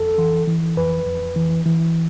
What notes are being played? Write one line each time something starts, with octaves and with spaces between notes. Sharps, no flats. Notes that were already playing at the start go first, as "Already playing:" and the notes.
Already playing: F2 A4
E3
E3
F2 B4
F2
E3
E3